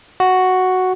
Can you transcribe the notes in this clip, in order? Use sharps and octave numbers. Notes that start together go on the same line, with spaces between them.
F#4